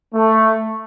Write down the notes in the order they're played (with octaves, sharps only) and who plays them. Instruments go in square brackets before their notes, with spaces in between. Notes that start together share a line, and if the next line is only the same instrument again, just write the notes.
[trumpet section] A3